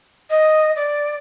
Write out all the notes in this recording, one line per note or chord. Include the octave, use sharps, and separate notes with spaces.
D#5
D5